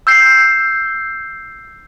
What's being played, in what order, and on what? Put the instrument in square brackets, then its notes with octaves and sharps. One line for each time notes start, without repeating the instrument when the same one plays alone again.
[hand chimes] E6 G6 C7